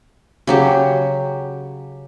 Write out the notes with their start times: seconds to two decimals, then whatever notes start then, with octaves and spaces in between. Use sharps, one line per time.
0.47 C#3 F#3 G4